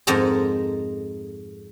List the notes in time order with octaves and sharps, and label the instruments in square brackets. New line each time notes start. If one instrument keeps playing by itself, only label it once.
[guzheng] F2 G#2 D#4 A4 A#4 D#5